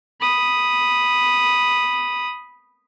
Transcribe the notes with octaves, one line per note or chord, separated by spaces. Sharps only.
B5 D#6